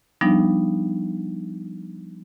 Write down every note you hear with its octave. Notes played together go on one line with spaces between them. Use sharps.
F3 G3 B3 D4 D#4